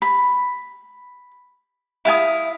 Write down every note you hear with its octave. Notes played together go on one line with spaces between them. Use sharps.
B5
E4 F5 G#5 D#6